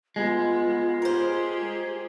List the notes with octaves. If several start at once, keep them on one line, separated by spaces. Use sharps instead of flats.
G#3 B3 F4
G4 G#4 A#4 C5